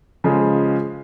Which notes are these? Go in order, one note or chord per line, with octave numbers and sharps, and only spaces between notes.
C#3 F3 G#3